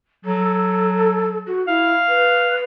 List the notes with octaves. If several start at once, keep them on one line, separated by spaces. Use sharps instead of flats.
F#3 A4
F#4
E4 F5
B4